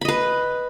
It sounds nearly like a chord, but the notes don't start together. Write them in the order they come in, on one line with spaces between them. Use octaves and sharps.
B5 D#5 B4